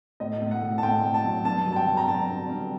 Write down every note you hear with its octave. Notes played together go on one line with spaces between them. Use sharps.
A2 D#5
A2
F#5
A2
A5
A2 G5
A2
A5
F#3
G2 A5
F#3
A5
G5
F#3
A#5
G2 A5
D3
G2